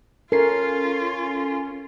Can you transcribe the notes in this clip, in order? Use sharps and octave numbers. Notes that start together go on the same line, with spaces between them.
C#4 F4 A4 A#4 C7